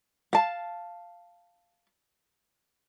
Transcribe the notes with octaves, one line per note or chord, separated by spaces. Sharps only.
F5 A5